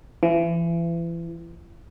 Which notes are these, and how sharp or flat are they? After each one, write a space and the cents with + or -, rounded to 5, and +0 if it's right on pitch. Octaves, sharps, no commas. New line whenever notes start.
E3 +35